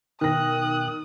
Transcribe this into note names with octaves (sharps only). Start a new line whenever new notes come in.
B2 D#3 G5 D#6 F#6 A#6